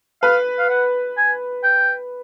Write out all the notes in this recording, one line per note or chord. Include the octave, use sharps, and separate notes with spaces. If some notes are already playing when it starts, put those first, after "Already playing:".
B4 F5
F5
F#5
G#5
G5